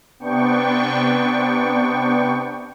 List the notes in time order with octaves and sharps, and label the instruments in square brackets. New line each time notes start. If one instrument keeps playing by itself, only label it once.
[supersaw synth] C3 B3 D4 G5 C#6